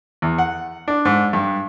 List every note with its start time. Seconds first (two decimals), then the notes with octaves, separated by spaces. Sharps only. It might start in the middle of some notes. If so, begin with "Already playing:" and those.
0.22 E2
0.38 F#5
0.88 D4
1.05 G#2
1.33 G2